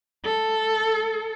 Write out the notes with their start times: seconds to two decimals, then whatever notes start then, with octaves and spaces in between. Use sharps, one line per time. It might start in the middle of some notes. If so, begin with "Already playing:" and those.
0.25 A4